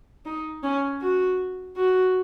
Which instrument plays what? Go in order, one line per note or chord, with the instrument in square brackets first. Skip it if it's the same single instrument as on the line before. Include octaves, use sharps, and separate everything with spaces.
[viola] D#4
C#4
F#4
F#4